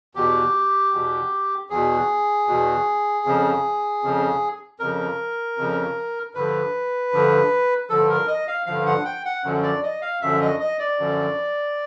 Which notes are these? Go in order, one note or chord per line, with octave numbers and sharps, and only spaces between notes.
E2 B2 G4
E2 B2
E2 B2 G#4
E2 B2
F2 C#3 F3
F2 C#3 F3
F2 C#3 F3 A#4
F2 C#3 F3
G2 D3 F3 B4
G2 D3 F3
G2 D3 F3 A4
A#4
D#5
F5
G2 D3 F3 F5
F#5
G5
F#5
F#2 D3 F3
D5
D#5
F5
F#2 D3 F3 E5
D#5
D#5
D5
F#2 D3 F3